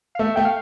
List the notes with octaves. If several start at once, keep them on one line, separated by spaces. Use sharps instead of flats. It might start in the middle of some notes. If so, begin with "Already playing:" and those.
F5
A3 E5
A3 G5
F5